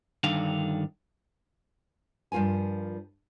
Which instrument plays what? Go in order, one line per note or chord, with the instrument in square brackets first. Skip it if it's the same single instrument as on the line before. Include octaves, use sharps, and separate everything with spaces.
[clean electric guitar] G2 D3 D#3 F5
[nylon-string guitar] G2 F3 F4 A#4 G#5